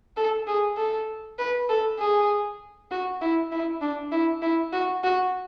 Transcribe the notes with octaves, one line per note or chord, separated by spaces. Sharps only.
A4
G#4
A4
B4
A4
G#4
F#4
E4
E4
D4
E4
E4
F#4
F#4